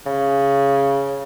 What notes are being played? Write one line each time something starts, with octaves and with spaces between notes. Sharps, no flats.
C#3